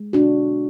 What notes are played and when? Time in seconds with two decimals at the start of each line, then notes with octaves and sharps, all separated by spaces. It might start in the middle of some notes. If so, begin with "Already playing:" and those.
Already playing: G#3
0.13 B2 D4 F#4